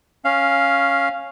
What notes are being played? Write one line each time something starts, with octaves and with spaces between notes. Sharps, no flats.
C#4 F5